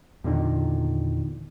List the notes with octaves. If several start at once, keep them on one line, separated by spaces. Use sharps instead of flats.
E2 A#2 D3 D#3